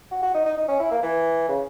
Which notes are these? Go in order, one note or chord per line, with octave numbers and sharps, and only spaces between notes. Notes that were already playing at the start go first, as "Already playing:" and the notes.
F#4
F#4
D#4
D#4
D#4
C#4
E4
A#3
E3
C#3